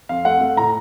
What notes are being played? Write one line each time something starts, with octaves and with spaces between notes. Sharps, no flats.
F2 F5
A3 F#5
A3
A2 A#5